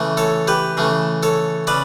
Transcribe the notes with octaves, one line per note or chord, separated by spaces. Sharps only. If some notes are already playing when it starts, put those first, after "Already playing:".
Already playing: C#3 E3 A3
A4 C#5
G4 B4
C#3 E3 A3
A4 C#5
C#3 B4 D5